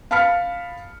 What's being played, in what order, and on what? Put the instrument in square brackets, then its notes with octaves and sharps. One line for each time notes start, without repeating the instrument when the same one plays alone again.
[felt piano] F5 A5 B5 F6 B6 C#7